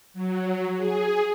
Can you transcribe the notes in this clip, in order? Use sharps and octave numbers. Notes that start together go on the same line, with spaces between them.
F#3
G#4